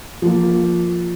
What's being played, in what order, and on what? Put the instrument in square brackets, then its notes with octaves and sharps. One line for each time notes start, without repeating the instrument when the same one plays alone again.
[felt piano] F3 A#3